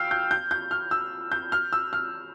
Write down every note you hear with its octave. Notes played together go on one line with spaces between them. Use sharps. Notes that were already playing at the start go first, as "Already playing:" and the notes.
Already playing: F5 G5 E6 F6
G6
G6
G6
F6
E6
G6
F6
E6
F6